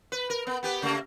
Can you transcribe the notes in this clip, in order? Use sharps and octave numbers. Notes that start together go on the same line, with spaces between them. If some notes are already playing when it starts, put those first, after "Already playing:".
B4
A#4
B3
B3 G4 B4
C#3 A3 A#3